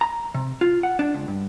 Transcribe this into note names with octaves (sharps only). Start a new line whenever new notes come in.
A#5
C3
F4
F#5
D4
C#2
G2